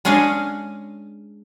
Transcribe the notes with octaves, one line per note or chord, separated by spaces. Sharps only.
G#3 C#4 D4 G#4 D#5 F5